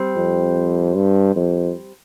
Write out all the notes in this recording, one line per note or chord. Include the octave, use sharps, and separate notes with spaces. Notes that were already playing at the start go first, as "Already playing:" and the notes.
Already playing: G3 C4
F2
G2
F2